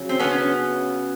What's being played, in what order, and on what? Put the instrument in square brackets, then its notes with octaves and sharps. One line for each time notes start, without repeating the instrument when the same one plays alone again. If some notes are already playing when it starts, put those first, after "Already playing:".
Already playing: [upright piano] C#3 F#3
[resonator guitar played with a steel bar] C4
B3 C#4